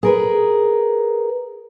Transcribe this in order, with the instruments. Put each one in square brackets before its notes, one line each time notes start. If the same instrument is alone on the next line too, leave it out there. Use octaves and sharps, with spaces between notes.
[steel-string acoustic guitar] G#4 A#4 B4